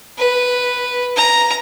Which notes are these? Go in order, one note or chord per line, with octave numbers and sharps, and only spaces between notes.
B4
A#5